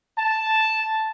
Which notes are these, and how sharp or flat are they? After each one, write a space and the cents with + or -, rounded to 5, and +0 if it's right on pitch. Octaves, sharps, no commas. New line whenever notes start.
A5 +0